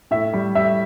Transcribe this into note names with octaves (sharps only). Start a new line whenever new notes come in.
A2 E5
G3
G3 E5